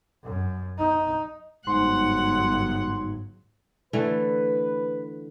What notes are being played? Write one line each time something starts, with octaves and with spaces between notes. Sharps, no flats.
F#2
D#4
G1 G#2 F#3 F#5 C6
D3 E3 A3 B4